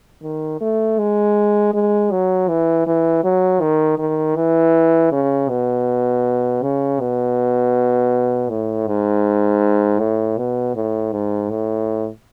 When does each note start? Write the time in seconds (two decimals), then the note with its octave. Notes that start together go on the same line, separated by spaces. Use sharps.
0.23 D#3
0.61 A3
0.99 G#3
1.74 G#3
2.11 F#3
2.48 E3
2.87 E3
3.24 F#3
3.61 D#3
3.98 D#3
4.36 E3
5.12 C#3
5.49 B2
6.62 C#3
7.00 B2
8.50 A2
8.88 G#2
9.99 A2
10.37 B2
10.75 A2
11.12 G#2
11.50 A2